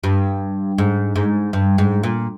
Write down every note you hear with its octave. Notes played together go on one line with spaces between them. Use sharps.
G2
G#2
G#2
G2
G#2
A#2